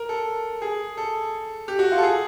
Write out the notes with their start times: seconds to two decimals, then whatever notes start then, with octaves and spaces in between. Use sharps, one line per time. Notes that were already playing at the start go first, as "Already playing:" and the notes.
Already playing: A#4
0.09 A4
0.62 G#4
0.97 A4
1.68 G4
1.79 F#4
1.92 F4
1.98 A4
2.03 G#4